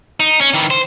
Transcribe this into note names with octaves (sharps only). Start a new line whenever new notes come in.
D#4
C#4
D#3 E3
C5